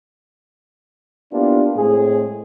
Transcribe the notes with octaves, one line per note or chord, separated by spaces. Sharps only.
A#3 B3 D4 E4 F4 G4
A2 G#3 C4 G#4